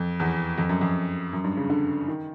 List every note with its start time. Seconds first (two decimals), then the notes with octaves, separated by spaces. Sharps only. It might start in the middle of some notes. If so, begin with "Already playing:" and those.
Already playing: F2
0.20 E2
0.58 F2
0.69 F#2
0.81 F2
1.33 F#2
1.44 G2
1.57 C#3
1.70 D3
2.08 D#3